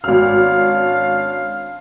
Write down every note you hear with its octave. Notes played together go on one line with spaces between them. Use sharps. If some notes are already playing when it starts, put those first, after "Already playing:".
G#1 C#4 D4 F5 F6